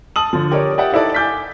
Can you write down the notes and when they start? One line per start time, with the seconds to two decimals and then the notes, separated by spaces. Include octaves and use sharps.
0.16 A5 D#6 F#7
0.33 D3 F3
0.52 G4 A#4 C#5 D5
0.78 G4 D5 E5 F#5 G5
0.92 D#4 E4 A4 D5
1.14 G#5 D6 G6 A6 B6